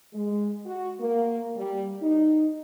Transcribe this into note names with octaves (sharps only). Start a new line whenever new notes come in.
G#3
F#4
A#3
G3
D#4